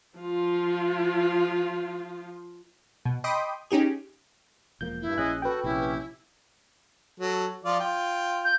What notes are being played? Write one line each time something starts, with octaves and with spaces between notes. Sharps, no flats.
F3 F4
B2
D#5 G5 B5 C6 D6 D#6
C#4 D#4 G4 G#4
E1 F3 A#3 G6
G2 E4
A#1 C#4 G#4 D#5 G#5 F#6
F#4 A4 B4 G5
A#1 C3 C#4 E4 G4
F#3 A4
F3 F4 D5
F4 G5
G6